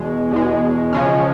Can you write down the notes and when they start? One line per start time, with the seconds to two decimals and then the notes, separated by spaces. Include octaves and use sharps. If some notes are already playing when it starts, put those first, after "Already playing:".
Already playing: E2 B2 G#3
0.31 E2 B2 G#3
0.93 C#3 F3 G#3 C#4